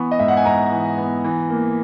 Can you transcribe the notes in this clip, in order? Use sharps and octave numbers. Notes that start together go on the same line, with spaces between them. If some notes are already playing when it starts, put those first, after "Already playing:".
Already playing: E3 B3 C#6
D#5
G#2 E5
F#5
G#5
G#2 A#5
E3
B3
E3
A#3